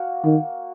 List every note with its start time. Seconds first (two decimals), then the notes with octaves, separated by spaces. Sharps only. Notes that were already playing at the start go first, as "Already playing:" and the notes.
Already playing: A#3 F#4
0.24 D#3